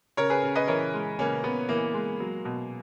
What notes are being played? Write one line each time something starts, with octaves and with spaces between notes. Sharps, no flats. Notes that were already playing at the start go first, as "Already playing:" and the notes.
C#3 A#4 C#5
G#4 B4
C#3
B4 D#5
E3 A#4 C#5
G#3
C#3 A#3 C#4
C#3 B3
E3 A#3
G#3
F#3
B2